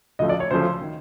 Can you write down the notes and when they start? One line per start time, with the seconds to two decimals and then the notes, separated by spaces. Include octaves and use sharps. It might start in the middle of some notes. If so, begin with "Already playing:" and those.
0.19 D2 C#3 F3 A3 D#5
0.29 D5
0.40 C#5
0.51 D2 C#3 F3 A3 C5
0.81 D#3